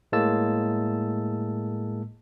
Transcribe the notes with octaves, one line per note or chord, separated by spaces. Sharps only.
A2 G#3 A#3 A5 E6